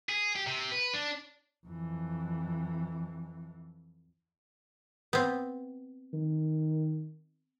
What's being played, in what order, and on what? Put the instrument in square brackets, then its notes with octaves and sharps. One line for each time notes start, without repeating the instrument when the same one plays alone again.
[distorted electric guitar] G#4
G4
C3
B4
D4
[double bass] F2 E3
[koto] B3 C4
[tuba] D#3